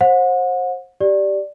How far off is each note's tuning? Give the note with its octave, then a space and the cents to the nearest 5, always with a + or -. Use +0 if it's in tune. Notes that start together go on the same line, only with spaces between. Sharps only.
C5 +30 F#5 -35
G4 -10 D5 +0